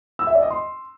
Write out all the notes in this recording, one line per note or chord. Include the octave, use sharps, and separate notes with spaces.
E6
E5
D5
D#5
C6